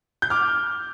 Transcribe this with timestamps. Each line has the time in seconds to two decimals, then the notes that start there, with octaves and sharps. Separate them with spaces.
0.22 G6
0.30 D6 F6